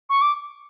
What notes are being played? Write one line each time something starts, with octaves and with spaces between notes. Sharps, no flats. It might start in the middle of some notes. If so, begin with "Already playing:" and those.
C#6
D6